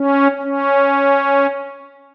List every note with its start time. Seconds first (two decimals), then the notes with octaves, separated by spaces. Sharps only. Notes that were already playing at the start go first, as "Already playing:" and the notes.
Already playing: C#4
0.42 C#4